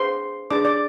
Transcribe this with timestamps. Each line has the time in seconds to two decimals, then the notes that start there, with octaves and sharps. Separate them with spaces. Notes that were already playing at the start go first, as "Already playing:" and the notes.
Already playing: D4 G#4 B4 C5 C6
0.51 D4 G#4 B4 D5 D6
0.65 D5 D6